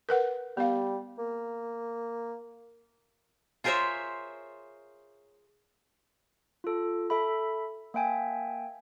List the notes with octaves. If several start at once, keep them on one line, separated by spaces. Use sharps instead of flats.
A#4 B4 F#5
G3 B3 F5
A#3
F4 G#4 A#4 C5 C#5 E5
F4 A4
A4 E5 B5
A#3 E5 G5 G#5